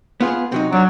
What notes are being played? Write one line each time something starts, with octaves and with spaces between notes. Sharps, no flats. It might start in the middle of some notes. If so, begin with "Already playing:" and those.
B3 F4 G#4
C3 F#3 D#4
F#3 D4